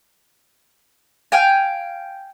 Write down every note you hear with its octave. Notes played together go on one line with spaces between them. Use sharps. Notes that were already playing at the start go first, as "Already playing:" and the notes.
F5 G5 G#5